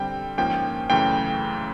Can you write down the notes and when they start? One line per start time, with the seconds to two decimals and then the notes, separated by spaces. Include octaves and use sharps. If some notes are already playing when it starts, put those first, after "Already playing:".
Already playing: D3 G3 C4 G5
0.38 G#2 F3 A#3 C#4 G5
0.90 F#2 C#3 E3 A3 C#4 G5